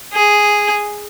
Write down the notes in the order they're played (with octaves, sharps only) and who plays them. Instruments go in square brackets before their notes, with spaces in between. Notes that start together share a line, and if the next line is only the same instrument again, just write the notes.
[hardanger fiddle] G#4